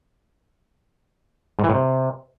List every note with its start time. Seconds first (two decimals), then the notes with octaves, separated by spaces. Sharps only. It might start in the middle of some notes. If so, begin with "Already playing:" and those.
1.59 G#2
1.64 E3
1.69 A2
1.74 C3